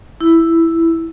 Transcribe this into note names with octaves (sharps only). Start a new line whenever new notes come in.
E4